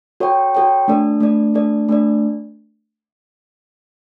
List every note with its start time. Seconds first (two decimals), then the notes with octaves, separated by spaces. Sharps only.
0.20 F#4 A4 C#5 G5
0.55 F#4 A4 C#5 G5
0.88 A3 D4 A4 D5
1.21 A3 D4 A4 D5
1.54 A3 D4 A4 D5
1.89 A3 D4 A4 D5